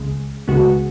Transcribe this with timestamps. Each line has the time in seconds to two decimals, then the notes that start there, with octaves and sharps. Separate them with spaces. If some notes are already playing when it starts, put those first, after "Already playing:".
Already playing: C#2 C#3 G#3
0.48 C#2 C#3 G#3 B3 F#4